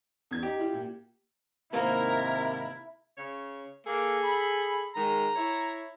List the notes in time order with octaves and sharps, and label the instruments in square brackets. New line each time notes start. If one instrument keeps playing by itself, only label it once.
[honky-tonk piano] E2 G#6
[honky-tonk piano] D#4 [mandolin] G4
[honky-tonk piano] E4 F4
A#2
[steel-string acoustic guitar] G#2 D#3 A#3 [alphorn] C3 [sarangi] E4 [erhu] A#4
[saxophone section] C#3 C#5
[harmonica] A#3 [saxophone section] G#4 A4
[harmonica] B5
[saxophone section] D#3 G#3 [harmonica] A#5
[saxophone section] E4 C#5